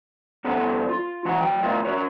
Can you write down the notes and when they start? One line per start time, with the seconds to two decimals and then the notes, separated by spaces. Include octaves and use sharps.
0.44 G2 B3 A4 C5 F#5
0.89 F4
1.25 E3 F#4 F#5
1.41 F#3 G5
1.63 A2 B3 F4 A#4 D#5 F5
1.85 F#4 A#4 C#5